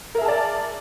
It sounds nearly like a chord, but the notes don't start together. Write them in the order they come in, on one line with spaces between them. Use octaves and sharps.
A#4 E5 G#4 A5 D5